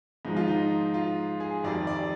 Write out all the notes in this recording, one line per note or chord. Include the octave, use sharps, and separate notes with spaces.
G#2 F3 D#4
F4
D#4
F4
G#4
F2 D#3 G3 D5
D5